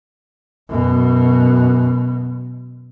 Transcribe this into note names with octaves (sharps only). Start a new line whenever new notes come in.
F#2 B2